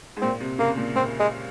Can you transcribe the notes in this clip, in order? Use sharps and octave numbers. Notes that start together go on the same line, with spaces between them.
G#2
A#2 C4
C3
C#3 A#3
A#2
A#2 C4
G#3